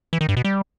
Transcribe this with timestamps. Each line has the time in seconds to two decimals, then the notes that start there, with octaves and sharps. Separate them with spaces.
0.13 E3
0.21 D#3
0.29 G2
0.37 B2
0.45 G3